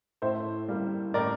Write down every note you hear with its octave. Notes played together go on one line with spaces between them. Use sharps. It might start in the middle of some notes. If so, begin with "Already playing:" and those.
A2 C5 E5
G3 A#3
A2 A#4 D5